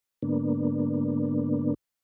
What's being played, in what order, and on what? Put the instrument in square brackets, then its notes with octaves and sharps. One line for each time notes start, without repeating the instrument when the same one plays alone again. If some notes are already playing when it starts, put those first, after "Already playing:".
[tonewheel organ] G#2 D3 A#3 B3 D4